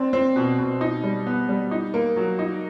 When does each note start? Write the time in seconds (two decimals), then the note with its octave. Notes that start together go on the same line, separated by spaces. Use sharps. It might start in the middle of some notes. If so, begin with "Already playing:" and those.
Already playing: C4 D4
0.13 C4
0.36 B2
0.58 B2
0.81 D#4
1.04 G3
1.27 B3
1.49 G3
1.71 D#4
1.94 A#3
2.16 F#3
2.39 D#4